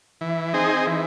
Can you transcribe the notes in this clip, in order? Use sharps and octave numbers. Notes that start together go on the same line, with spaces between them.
E3
C4 D#4 G#4
E3